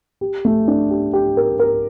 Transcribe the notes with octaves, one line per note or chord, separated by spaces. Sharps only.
G4
A3
D4
G4
G4
A#4
A#4